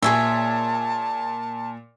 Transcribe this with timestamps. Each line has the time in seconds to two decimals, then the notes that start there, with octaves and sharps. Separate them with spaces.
0.03 A#2 G#4 C#5 E5 A5